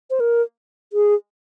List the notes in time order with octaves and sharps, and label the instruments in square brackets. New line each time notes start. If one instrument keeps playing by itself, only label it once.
[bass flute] C5
A#4
G#4